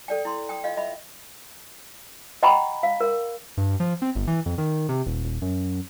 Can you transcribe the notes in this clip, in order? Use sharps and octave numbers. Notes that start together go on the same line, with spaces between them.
A4 D5 G5
E4 C6
G5 D#6
F4 D#5 F5
D#5 E5 B5
D#5 F#5 G5 A#5 B5 C#6
F5
A#4
G2
F3
C4
G1
E3
F2
D#3
C3
D#1
D#1
F#2